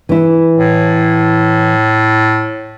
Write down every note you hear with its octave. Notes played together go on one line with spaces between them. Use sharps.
E3 E4
A2